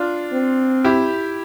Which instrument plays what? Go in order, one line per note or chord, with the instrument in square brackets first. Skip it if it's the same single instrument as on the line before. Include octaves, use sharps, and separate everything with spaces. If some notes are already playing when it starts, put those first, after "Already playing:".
Already playing: [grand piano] D4 F4
[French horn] C4
[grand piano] E4 G4